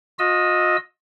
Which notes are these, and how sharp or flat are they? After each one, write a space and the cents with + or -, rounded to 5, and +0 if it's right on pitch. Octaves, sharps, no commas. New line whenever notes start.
F4 +45 D#5 +0 E6 +0